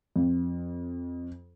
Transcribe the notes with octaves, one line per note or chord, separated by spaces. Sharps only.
F2